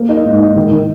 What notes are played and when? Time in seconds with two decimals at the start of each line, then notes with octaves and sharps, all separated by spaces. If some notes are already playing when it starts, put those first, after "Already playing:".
Already playing: A#3
0.09 D#4
0.25 G#2
0.40 D#4
0.56 D#3
0.71 D#3